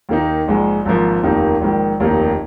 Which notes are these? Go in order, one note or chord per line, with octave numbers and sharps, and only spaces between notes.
D#2 D#3 A#3 D#4
A#1 G#2 G#3
G#1 G#2 F3 A#3
F1 D#2 D#3 A#3 D#4
A#1 G#2 D#3
F1 D#2 D#3 A#3 D#4